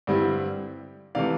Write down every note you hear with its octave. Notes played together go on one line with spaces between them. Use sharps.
G2 D3 G3 C4 E4
C3 E3 A3 D5 F5